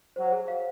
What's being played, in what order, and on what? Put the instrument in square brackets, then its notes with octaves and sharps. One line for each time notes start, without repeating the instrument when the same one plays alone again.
[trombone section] F#3 [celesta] C5
[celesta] G#4
F5